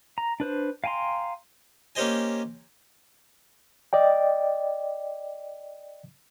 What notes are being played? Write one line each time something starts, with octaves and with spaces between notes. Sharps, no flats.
A#5
D4 B4 C5
F5 G5 G#5 A#5 C6
A#3 C#4 G4 C5 D#5 G#5
D5 D#5 G5